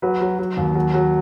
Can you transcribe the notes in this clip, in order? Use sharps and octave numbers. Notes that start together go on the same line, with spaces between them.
F#3 B4
F#3
F#3
D#2
F#3
F#3